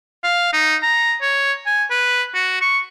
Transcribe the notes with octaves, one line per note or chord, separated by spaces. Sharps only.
F5
D#4
A#5
C#5
G#5
B4
F#4
C#6